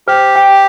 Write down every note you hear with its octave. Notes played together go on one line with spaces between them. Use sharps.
G4 C5
G5